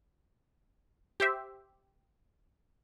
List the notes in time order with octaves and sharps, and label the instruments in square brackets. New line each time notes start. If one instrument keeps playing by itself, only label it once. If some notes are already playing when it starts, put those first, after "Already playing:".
[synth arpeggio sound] G4 C5 E5